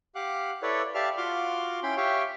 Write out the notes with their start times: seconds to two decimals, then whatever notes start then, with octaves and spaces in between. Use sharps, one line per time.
0.15 G4 F5 F#5 D6 F#6
0.63 E4 A4 B4 C#5 D5
0.95 G4 D5 E5 F5 A5 F6
1.17 F4 F#4 C6 D6 F6
1.83 C#4 E4 G5 B5 C6
1.97 G4 C#5 E5 F5 G5 C#6